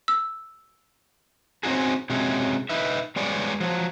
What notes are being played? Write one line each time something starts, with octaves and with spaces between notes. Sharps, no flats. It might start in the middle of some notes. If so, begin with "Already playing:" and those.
E6
C4 C#4 D#4 F#4 G#4
C3 F#3 G#3 C#4
D#4 B4 E5
G3 G#3 B3 C#5 D5
F3 F#3